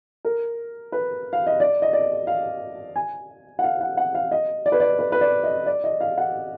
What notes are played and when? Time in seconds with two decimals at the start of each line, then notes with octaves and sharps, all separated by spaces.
0.25 A#4
0.92 B4
1.33 F5
1.47 D#5
1.60 D5
1.82 D#5
1.93 D5
2.27 F5
2.96 G#5
3.59 F#5
3.64 F5
3.81 F#5
3.97 F#5
4.15 F5
4.31 D#5
4.66 D5
4.72 B4
4.80 D5
4.99 B4
5.12 B4
5.21 D5
5.44 D#5
5.66 D5
5.84 D#5
6.01 F5
6.18 F#5